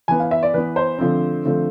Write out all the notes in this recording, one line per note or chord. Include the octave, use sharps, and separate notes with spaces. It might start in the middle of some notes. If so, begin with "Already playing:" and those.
E3 B3 G#5
F5
E5
D5
E3 B3 B4
C5
D3 F3 A3 C4
D3 F3 A3 C4